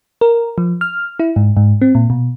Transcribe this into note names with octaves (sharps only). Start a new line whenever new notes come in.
A#4
F3
F6
E4
G#2
G#2
C4
A#2
B2